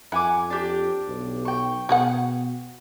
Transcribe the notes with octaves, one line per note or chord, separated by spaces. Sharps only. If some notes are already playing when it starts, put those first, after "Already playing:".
F2 E4 F#5 G#5 D6
D4 G4
B1
G5 C#6
B2 F#4 G#4 F#5